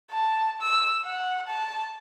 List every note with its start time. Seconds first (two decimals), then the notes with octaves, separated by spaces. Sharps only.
0.10 A5
0.61 E6
1.05 F#5
1.48 A5